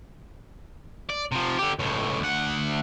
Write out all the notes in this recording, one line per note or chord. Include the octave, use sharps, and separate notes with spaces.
D5
C3 F3
D3 G4
C#2 A2
D2 F#5